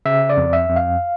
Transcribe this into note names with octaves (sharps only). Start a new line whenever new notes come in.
C#3 E5
D5
F2
E5
F2
F5